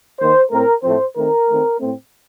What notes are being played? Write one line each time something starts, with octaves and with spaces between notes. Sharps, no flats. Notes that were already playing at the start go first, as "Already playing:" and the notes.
D#3 A#3 C5
A2 A3 C4 A#4
A2 F3 A3 C4 C5
D#3 A3 C4 A#4
D#3 A3 C4
A2 A3 C4